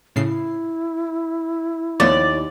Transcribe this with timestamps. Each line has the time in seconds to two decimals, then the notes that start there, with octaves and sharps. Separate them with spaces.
0.16 A2 C#3 E4 C7
2.00 D#2 F3 A3 B3 D5